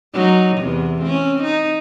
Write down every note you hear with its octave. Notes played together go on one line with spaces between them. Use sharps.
F#3 D#4
E2 C3
C4 C#4
D#4